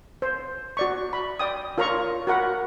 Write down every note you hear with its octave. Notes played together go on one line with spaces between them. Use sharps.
C5
F#4 D5 C#6
B5
D5 G5 D#6
F4 A#4 C#5 A#5 C6 C#6
F#4 A#4 F#5 B5